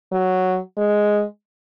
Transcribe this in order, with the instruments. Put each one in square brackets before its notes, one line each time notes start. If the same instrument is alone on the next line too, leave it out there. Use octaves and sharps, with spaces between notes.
[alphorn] F#3
G#3